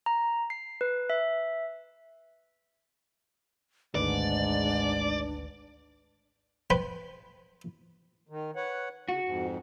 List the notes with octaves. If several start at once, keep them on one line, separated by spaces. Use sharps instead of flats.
A#5
C7
B4
E5
G#1 D2 G#2 D4 B4 D5
B4 C5 G5 B5
D#3
B4 C#5 F#5
C#3 F#4
F2 G#2